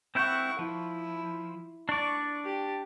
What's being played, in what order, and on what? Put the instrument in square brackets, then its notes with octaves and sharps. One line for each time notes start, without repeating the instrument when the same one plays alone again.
[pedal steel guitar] C4 E4 G6 [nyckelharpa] F#5 C#6
[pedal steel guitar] F3 [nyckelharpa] E4
[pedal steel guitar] D4 D5 [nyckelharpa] C#6
[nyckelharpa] G4